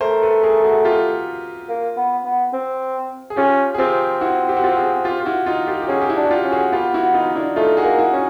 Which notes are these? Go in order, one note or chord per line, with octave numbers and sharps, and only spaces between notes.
A3 A#4 C5
A4 B4
G#4 A#4
F#4 G#4
F4 G4
A#3
B3
B3
C4
G#4
C#4 F4 G4
G#4
C4 F4 G4
E4 F#4
G4
F#4
F4 G4
F#4 G#4
F4 G4
F4
E4 F#4
D#4 F4
F4 G4
G4
C#4 F#4 G#4
G4
E4 F#4
D4
F#4
F4 G4
C#4
F#4 G#4
B3 F4 G4
E4 F#4
D#4 F4
D4 E4
A3 D#4 F4
F#4 G#4
A#3
E4 F#4
C#4 F#4